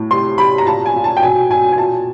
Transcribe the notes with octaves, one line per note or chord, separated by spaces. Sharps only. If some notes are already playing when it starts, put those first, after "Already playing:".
Already playing: A2
C3 C6
C3 B5
A#5
A#2 A5
G#5
A#2
A5
G5
B2 G#5
B2 G#5
G#5
A#2 A5